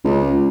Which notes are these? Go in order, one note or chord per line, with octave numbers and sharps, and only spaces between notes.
C#2